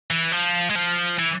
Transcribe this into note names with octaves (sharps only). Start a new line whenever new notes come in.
E3
F3
G#3
F3
E3